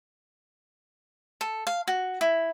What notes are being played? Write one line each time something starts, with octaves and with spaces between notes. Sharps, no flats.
A4
F5
F#4
E4